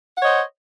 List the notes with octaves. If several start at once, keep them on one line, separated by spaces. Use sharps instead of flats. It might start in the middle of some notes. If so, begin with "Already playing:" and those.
C5 C#5 D#5 F#5